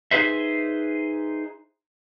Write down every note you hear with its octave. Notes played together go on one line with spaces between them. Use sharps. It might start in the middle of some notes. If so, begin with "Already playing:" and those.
D#4 G#4 B4 C5 E5